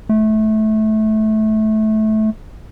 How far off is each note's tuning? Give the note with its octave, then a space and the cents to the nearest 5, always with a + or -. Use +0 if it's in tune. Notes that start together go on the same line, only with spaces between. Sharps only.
A3 -20